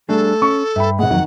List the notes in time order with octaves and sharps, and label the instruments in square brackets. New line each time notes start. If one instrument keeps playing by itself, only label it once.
[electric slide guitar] G3 D4 G#4 [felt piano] A3 [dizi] A4
[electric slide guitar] C#4 [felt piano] C#6
[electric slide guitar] G2 [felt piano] E5 G5 B5
[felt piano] G#1 G#3 [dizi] F#5
[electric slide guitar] F2 F#3 [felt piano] D#3